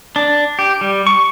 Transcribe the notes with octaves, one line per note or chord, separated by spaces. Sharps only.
D4
G4
G3
C#6